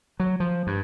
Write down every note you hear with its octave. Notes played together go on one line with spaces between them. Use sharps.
F#3
F3
G2